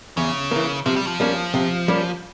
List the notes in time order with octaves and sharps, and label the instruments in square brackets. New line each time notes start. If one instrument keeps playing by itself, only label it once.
[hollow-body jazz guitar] E2 [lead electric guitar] C#3
[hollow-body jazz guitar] E3 A#3
[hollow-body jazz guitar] C3 [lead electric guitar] F3
[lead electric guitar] G3
F3
[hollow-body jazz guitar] G3 A#3 C#4
C3
G3 A#3 C#4